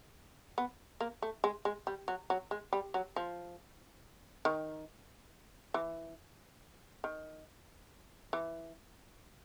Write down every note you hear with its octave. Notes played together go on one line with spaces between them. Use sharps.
B3
A#3
A3
G#3
G#3
G3
F#3
F#3
G#3
G3
F#3
F3
D#3
E3
D#3
E3